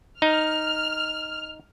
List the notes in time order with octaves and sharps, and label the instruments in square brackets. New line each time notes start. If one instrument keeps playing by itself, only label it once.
[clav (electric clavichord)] D#4 [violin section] F6